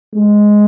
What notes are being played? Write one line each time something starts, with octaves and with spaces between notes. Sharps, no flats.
G#3